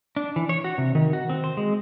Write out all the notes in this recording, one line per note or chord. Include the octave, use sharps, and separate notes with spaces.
D4
E3
C#5
F#4
C3
D#3
F#4
C4
C5
G#3